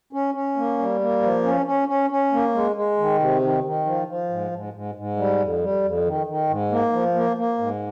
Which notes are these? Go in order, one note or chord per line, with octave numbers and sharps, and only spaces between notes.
C#4
C#4
A#3
G3
A#3
F3
C#4
C#4
C#4
C#4
A#3
G#3
G#3
D#3
C3
D#3
D#3
F3
F3
G#2
G#2
G#2
G#2
G3
F2
G3
F2
D#3
D#3
G#2
A#3
F3
A#3
A#3
G#2